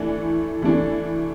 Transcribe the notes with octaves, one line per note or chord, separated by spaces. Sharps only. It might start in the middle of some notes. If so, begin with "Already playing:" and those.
Already playing: E3 A3 D4
E3 A3 D4